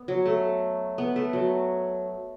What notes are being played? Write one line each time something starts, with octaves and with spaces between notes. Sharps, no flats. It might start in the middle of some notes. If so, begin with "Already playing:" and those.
Already playing: B3
F#3
A3
B3
A3
F#3